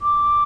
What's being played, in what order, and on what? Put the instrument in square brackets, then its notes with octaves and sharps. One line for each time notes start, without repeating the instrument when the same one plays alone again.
[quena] D6